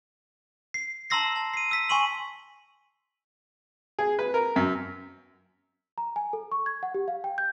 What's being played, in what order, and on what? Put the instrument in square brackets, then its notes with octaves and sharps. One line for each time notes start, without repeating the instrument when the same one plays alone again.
[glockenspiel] C7
A5 A#5 C6 E6 A#6 C7
A5
C7 D#7
E6 B6
G#5 C6 C#6 D#7 F#7
[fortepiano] G#4
B4
A#4
F#2
[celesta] A#5
G#5
A4
C#6
G#6
F#5
G4
F5
G5
G6